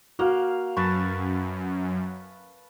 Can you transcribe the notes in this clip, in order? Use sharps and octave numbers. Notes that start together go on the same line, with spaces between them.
A#3 F#4 F5
F#2 B4 A5 C#6